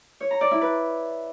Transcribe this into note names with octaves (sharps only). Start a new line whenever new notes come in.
C#5
A#5
D5
E4
B4